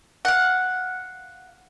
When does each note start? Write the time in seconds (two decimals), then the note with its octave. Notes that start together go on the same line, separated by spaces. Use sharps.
0.25 F5 F#5